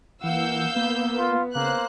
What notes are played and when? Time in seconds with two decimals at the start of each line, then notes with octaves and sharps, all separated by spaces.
0.24 E3 A#3 F5 F#5 E6 G6
0.76 A#3 B3 B4
1.19 F4
1.55 C#3 A#3 C5 F#6